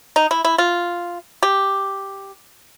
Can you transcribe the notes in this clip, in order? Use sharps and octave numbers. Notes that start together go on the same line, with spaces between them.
D#4
E4
E4
F4
G4